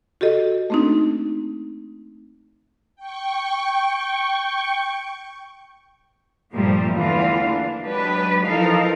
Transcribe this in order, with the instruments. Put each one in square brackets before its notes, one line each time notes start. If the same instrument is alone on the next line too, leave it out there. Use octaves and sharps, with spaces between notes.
[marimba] F#4 G4 A4 D#5
A3 A#3 C4 D4 D#4
[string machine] G5 C#6
[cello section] G2 A#2 F3 G3 A3 A#3
E2 D3 E3 A3 F4 F5
A#3 D4
F#3 G#3 D4 G4 B4
E3 F3 D#4 A4 A#4 F5